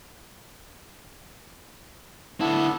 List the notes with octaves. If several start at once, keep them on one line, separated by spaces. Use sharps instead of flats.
D3 B3 D4 E4 A4